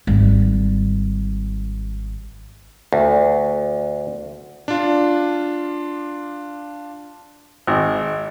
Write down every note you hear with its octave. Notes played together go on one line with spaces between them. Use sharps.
G#1 G3
D2
D4 F4
G#1